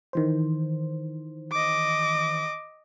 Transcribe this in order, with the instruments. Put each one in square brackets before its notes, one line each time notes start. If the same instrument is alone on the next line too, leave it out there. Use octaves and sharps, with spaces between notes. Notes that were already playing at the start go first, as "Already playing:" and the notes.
[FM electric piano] D#3 E3 C5
[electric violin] D#5 D6